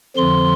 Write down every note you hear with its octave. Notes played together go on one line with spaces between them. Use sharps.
F2 D3 F3 C6